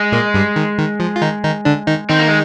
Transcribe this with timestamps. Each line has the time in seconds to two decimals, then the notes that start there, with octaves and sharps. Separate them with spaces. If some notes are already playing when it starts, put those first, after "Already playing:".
Already playing: G#3
0.12 A#2 A#3
0.34 G2 G3
0.56 D#3
0.78 D#3
1.00 F3
1.16 F4
1.22 D#3 D#4
1.44 D#3 D#4
1.65 D3 D4
1.87 D#3 D#4
2.10 D#3 C4 D#4
2.19 A#3
2.28 G#3